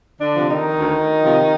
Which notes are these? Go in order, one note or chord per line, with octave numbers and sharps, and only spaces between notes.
D3 D4
C3 F3
D#3 D#4
D2
C3 F3